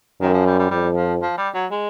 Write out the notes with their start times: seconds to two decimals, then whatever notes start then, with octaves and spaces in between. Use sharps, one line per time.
0.21 F#2 D#3
0.34 F3
0.47 G3
0.59 G3
0.71 F2 G3
0.96 F3
1.22 F3
1.37 G3
1.54 F#3
1.71 G#3